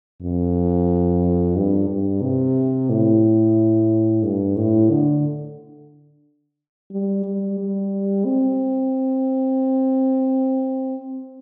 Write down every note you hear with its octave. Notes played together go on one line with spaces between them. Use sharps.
F2
G2
G2
C3
A2
G2
A2
D3
G3
G3
G3
C4